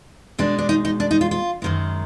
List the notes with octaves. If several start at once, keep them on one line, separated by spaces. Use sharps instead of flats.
B2 G#3 D4
D4
D#4
D#4
D4
D#4
F4
F4
F#2 D#3 G#3